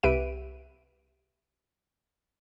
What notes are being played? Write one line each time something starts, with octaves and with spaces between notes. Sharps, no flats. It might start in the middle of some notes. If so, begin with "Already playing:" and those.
C2 G4 B4 E5 D7 D#7